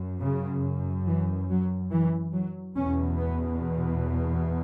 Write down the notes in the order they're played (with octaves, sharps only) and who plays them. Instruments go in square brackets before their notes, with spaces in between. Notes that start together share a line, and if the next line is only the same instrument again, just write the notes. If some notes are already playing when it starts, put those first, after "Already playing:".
Already playing: [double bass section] F#2
C#3
E3
F#3
E3
F#3
E2 B2 C#4
B3